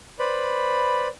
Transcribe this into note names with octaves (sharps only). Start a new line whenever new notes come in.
B4 C5 D5 B5